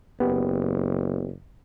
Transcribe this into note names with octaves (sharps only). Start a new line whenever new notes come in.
F#1 B3 G4